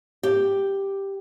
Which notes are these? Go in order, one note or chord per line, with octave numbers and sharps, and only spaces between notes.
G4